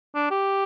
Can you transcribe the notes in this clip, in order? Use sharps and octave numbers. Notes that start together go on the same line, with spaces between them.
D4
G4